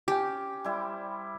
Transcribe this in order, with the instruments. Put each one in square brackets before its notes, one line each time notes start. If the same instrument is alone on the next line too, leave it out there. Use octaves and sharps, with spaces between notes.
[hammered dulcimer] C#4 [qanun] G4 [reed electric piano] G5 D6
[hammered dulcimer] G3 E4 C5